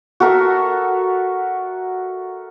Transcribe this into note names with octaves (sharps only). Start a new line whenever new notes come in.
F#4 A4 A#4 E5